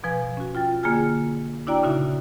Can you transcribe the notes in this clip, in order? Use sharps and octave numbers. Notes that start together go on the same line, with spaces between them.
B2 F3 B4 G#5
C#4 F#4
F4 G5 A6
D3 A#3 F4 G#4 G#5 F6
D4 E4 F#4 D5 G5 A#5
A#2 C#3 D#4 F#4 E5 D#6